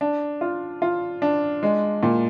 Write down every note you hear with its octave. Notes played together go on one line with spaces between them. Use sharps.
D4
F4
F4
D4
G#3
A#2